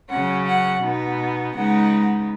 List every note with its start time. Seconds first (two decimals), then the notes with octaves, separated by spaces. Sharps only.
0.10 C#3 F#3 C#4 F#5
0.47 F#5
0.82 B2 B3 D#4
1.54 C#3 G#3 B3 D#4 F#5